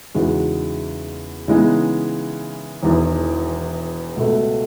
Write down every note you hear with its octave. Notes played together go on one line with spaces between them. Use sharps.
E2 C#3 G#3 D#4 F#4
C#3 E3 G#3 B3 D#4
E1 E2 D#3
C#2 B2 A3